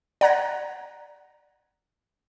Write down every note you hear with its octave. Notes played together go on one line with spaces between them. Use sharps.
D5 F#5 A#5 F#6 G#6 A#6